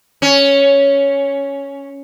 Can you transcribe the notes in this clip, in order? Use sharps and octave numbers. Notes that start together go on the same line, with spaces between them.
C#4